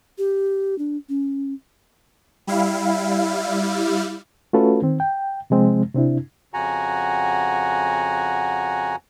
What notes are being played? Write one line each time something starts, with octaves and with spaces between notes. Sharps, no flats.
G4
D4
C#4
G3 E4 F5
A3 C#4 F4 F#4 A4 B4
D#3 C4
G5
C3 F3 G#3 C4
C3 C4 D4 E4
F2 C#3 F#4 F#5 G#5 A#5